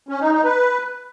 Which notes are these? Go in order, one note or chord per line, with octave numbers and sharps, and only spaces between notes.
C#4
D#4
D#4
B4